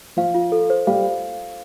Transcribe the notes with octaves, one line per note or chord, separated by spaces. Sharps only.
F3 F5
F4
A4
C5
G3 F5